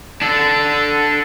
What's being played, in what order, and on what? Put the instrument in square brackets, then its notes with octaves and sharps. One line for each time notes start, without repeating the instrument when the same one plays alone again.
[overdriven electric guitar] D4 A4